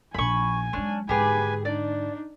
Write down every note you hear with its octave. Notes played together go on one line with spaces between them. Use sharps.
A#1 F3 G#5 B5 C#6
F#3 G#3 C#4 D4
G#2 D3 G4 G#4 B4 G#5
D4 D#4 D5